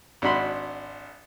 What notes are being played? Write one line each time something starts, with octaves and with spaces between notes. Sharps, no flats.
G#1 D4 F#4 B5 C6